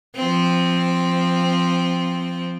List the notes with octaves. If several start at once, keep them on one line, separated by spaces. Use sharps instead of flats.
F3 C4